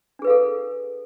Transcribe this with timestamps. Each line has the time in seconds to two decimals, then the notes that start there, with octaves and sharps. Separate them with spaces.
0.19 D4
0.22 G#4
0.25 B4
0.27 F5
0.30 A4